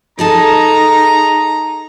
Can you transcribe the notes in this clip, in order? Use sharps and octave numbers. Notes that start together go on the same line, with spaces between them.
D#4 G#4 A4 A5 A#5